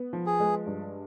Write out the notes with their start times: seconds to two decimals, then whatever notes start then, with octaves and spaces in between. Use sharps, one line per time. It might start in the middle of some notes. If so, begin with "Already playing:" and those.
Already playing: B3
0.13 F3
0.26 G#4
0.40 G#3
0.66 G2